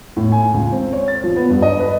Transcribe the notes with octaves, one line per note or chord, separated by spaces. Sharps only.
A2
G#5
C#2
C4
C#5
A6
F3
B3
G2
D#5
B4